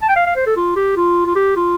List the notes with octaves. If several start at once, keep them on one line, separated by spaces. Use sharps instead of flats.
A5
G5
F5
F5
C5
A4
F4
G4
F4
F4
G4
F4